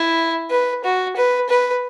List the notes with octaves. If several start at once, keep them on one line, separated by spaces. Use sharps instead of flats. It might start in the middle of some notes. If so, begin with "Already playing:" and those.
Already playing: E4
B4
F#4
B4
B4